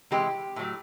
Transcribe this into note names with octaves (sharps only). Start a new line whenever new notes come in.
C3 E3 G#3 G4
A2 F#3 A3